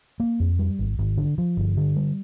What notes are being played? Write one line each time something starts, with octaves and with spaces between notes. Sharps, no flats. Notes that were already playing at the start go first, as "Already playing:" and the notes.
A#3
F2
G3
G#1
G#1
D3
F3
G1
D3
G3